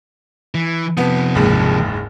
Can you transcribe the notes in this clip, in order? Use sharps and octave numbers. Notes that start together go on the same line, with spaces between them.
E3
C3 F3 B3
F#1 D#2 G#2